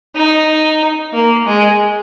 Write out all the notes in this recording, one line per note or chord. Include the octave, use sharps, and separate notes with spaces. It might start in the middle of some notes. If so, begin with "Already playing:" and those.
D#4
A#3
G#3